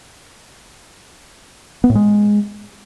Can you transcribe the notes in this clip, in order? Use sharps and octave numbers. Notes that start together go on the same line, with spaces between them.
B3
A2
G#3